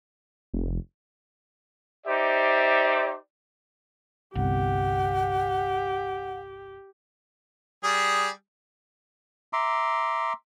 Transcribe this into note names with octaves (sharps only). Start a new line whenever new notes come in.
F1
D#4 G4 C5 D5 E5
G1 C2 G4 F#5
G3 G#4 D#6
E5 A#5 C6 D6